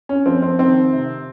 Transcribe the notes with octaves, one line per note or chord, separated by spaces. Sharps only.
C#4
F3 C4
C4
D#3 C4
C3